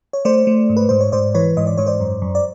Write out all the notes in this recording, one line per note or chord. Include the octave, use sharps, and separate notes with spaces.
C#5
A3 C5 D5
A3
G#2
B4
G#2 C5
C#5
G#2 C5 D5
E3 B4 C#5
G#2 D#5
D5
G#2 C#5
C5 D5
F#2
F#2
D5